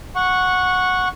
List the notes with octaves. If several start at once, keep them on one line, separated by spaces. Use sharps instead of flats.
F#5 C#6